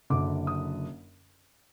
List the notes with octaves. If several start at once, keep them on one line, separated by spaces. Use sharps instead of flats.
F#1 F#2 D3 D6
D#6